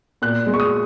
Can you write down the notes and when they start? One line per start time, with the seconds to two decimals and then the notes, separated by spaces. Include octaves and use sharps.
0.22 A#2 F#6
0.46 G#3
0.54 C#6
0.60 D#6